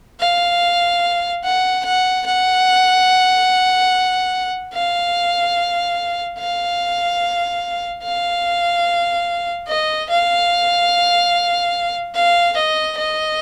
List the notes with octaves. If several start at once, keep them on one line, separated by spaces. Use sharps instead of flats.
F5
F#5
F#5
F#5
F5
F5
F5
D#5
F5
F5
D#5
D#5